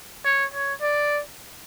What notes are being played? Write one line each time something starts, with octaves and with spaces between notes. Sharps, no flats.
C#5
C#5
D5